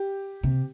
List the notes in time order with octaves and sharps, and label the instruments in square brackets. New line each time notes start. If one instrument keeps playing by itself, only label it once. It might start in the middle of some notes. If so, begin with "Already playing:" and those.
Already playing: [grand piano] G4
[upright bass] C3